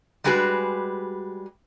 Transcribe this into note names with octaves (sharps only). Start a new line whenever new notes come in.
G3 G#3 F#4 G#4 B4